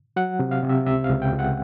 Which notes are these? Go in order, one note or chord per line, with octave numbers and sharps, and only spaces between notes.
F#3 F#5
C3
F5
C3
E5
C#2 E5
F5
C#2
G5
C#2
F#5